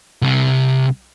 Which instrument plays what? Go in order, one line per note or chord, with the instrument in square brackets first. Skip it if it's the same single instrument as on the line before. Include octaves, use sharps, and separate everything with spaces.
[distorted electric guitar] C2 C3